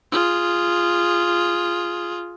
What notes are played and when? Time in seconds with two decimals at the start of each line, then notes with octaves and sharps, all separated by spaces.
0.12 F4 G#4